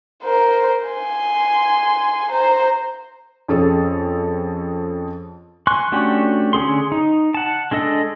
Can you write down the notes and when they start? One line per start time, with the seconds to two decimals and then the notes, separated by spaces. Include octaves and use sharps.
0.23 A#4 C5
0.89 G#5 C6
2.32 C5 A#5
3.48 F2 C#4 G#4 A4
5.67 G#5 C6 C#6 F#6
5.92 A3 C#4 D4 F#4 G4
6.53 D3 C#4 G#4 C6
6.92 D#4
7.34 F#5 A5
7.71 G#3 D4 A4 D#5